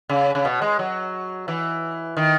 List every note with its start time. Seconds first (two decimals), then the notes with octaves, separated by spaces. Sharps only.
0.09 C#3
0.35 C#3
0.45 B2
0.62 G#3
0.79 F#3
1.48 E3
2.17 D#3